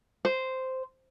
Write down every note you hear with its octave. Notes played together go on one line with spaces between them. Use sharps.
C5